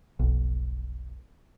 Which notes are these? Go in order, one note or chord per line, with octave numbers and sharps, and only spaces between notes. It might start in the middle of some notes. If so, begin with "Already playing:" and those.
F1 B1